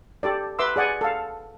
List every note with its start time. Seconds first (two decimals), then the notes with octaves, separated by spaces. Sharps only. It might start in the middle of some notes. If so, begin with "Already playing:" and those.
0.23 G4 A4 D5
0.59 B4 E5 C6 D6 E6
0.76 G#4 D5 F#5 G#5
1.01 A4 F5